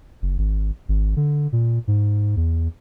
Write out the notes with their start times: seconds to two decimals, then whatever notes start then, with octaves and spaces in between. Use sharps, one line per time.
0.22 F#1
0.38 G#1
0.88 G#1
1.16 D3
1.52 A#2
1.88 G#2
2.36 E2